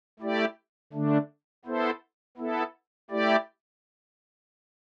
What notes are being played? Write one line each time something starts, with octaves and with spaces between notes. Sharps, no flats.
A3 E4 G4 D5
D3 A3 D4
B3 E4 A4 C5
B3 E4 A4
A3 E4 G4 D5